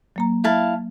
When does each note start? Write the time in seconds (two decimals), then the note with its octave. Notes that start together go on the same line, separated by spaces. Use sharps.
0.16 F#3 A#3 A#5
0.44 E4 F5 A5